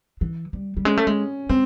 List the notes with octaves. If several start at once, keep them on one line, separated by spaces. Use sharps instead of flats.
E3
G3
G3
G#3 C#4
A3
G#3
G#3 C4